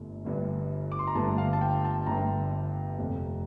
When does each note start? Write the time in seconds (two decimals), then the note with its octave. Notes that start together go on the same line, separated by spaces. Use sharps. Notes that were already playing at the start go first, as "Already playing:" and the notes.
Already playing: G1 G2 D3 A3
0.24 G1 G2 D3 A3
0.92 D6
0.99 C6
1.07 A#5
1.15 G1 G2 D3 A3 A5
1.38 F5
1.53 A5
1.61 G5
1.85 A5
2.06 G1 G2 D3 A3 A#5
2.98 F1 F2 C3